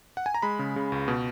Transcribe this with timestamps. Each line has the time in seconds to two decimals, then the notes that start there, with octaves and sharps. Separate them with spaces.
0.17 F#5
0.26 G#5
0.34 A#5
0.42 G#3 B5
0.59 C#3
0.76 C#3
0.92 C#2
1.08 B2